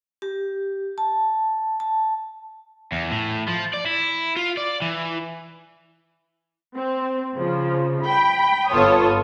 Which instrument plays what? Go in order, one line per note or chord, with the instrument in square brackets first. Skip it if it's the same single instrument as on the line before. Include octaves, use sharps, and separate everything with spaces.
[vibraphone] G4
A5
A5
[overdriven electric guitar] E2
A2
F3
D5
E4
F4
D5
E3
[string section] C4
C#3 F3
G5 B5
G1 B3 F4 A4 C#5 D#6